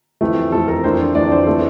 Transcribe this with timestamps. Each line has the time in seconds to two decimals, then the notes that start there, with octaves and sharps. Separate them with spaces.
0.21 F2 E3 A3
0.52 F2 E3 A3 A4
0.68 A#4
0.83 F2 E3 A3 D4 C5
1.15 F2 E3 A3 D4 D5
1.31 C5
1.46 E3 A3 C4 A4